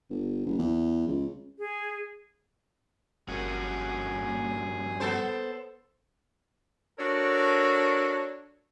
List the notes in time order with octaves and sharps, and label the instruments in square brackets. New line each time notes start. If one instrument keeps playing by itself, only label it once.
[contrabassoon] G1
F#1
E2
C#2
[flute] G#4
[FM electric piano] G1 A#3 [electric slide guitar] G2 C#4 F#4 [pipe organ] G#4
[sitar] B3 A4 C5
[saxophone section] D4 F#4 A4 A#4 C#5